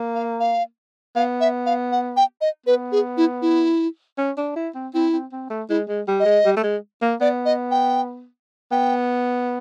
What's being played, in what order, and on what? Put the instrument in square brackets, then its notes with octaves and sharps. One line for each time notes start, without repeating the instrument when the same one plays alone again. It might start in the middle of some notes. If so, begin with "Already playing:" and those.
Already playing: [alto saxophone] A#3
[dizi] F5
F5
[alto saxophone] B3 [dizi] F5
[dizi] E5
F5
F#5
G5
D#5
[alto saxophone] B3 [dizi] B4
[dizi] G#4
E4
E4
[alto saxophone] C#4
D4
E4
C4
[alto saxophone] C4 [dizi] E4
[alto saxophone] C4
C4
A3
[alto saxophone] G#3 [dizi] E4
[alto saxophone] G#3
G3
[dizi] D#5
[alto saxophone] G#3
G3
A3
G#3
A#3
[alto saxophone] B3 [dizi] D5
[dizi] D#5
G5
[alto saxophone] B3 [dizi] G5